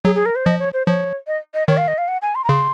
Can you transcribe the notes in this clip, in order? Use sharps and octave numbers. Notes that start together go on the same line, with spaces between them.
F#3 G#4
G#4
A#4
C5
F3 D#5
C#5
C5
F3 C#5
D#5
D#5
D#3 C#5
F5
D#5
F5
F#5
G#5
C6
A#5
C#3 C6